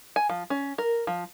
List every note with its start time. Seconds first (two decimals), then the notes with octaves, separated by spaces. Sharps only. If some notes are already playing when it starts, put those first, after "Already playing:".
0.16 G#5
0.29 F3
0.50 C#4
0.78 A#4
1.07 F3